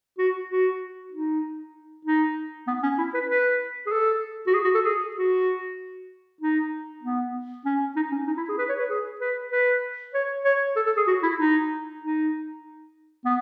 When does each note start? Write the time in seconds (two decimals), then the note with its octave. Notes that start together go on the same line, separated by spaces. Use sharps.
0.19 F#4
0.49 F#4
1.12 D#4
2.05 D#4
2.67 B3
2.83 C#4
2.99 E4
3.14 B4
3.30 B4
3.87 G#4
3.92 A4
4.47 F#4
4.54 G#4
4.64 F#4
4.75 A4
4.85 G#4
5.16 F#4
6.41 D#4
7.03 B3
7.66 C#4
7.96 D#4
8.12 C#4
8.27 D#4
8.38 E4
8.49 G#4
8.59 B4
8.69 C#5
8.79 B4
8.89 G#4
9.21 B4
9.52 B4
10.14 C#5
10.45 C#5
10.76 A4
10.87 A4
10.97 G#4
11.08 F#4
11.23 E4
11.38 D#4
12.01 D#4
13.25 B3